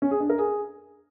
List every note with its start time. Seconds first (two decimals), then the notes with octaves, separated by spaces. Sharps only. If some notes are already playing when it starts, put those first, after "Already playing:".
0.02 C#4
0.11 G#4
0.20 D4
0.30 A#4
0.39 G#4